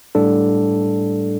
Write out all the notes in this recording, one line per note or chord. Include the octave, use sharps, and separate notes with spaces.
A2 G3 D4 A4